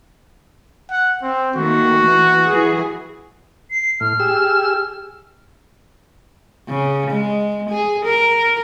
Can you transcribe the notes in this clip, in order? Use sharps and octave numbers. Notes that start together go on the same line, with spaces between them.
F#5
C4
D#3 A3 A#3 F#4
E3
E3 G#4
C7
A2 F6
G4 G#4 E6
C#3
G#3
G#4
A#4